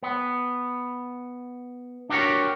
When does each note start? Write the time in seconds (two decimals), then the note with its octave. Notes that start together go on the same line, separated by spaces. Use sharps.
0.03 B3
2.09 D4 F#4 G4 A#4 C#5